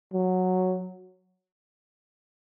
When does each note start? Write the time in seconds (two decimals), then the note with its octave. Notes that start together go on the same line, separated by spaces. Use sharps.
0.13 F#3